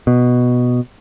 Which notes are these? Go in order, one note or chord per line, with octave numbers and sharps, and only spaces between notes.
B2